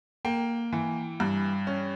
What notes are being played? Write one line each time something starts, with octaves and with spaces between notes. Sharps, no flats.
A#3 G5
E3
G2
C#4